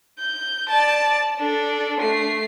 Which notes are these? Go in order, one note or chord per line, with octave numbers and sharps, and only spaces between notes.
G6
D5 A5
D4 A4
A3 C7